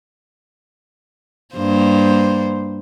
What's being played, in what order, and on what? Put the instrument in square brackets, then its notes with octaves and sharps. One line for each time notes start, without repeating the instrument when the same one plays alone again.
[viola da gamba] G2 A#3 C5